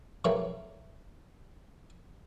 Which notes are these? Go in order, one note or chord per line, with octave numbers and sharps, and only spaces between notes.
C#3 E3 F#3 G3 A3 A#3